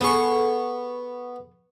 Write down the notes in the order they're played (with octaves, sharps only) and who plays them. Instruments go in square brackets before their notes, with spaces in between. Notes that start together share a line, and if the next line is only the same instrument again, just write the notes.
[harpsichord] B3 C#6 [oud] G#4 A4 B4